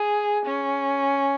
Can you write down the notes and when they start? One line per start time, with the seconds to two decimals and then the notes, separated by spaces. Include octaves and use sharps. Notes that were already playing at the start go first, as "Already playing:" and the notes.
Already playing: G#4
0.45 C#4